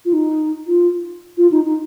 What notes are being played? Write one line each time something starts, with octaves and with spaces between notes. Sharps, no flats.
F4
D#4
F4
F4
D#4
D#4